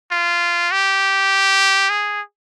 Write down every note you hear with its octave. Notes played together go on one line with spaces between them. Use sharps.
F4
G4
G#4